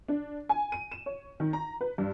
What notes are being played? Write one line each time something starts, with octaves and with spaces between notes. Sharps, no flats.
D4
G#5
D#7
E7
C#5
D#3
A#5
B4
G2